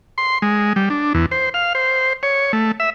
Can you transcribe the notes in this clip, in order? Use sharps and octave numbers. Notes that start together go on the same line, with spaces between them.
C6
G#3
G3
D4
E2
C5
F5
C5
C#5
A3
E5